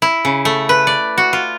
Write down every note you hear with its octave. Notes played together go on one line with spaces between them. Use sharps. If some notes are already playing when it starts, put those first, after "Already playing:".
E4
C#3
A3
B4
D5
F#4
F4